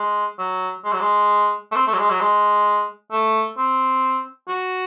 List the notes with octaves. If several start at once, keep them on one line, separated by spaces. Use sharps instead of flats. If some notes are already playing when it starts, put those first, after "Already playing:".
Already playing: G#3
F#3
G#3
F#3
G#3
A3
C4
A3
F#3
G#3
F#3
G#3
A3
C4
F#4